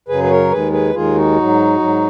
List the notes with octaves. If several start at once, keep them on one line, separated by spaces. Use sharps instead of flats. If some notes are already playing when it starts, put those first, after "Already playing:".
F#2 C#3 F#3 G#4 B4
B4
A#4 C#5
D#2 D#3 G#3 G#4 B4
G#4 B4
D#2 D#3 G#3 F4 G#4
D#4 F#4
G#2 F#3
G#2 F#3